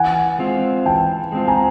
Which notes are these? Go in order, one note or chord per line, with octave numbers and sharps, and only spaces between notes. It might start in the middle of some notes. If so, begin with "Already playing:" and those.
Already playing: E3 F#5 G#5
G#3 C4 F4
E3 G5 A5
G#3 C4 F4
G#5 A#5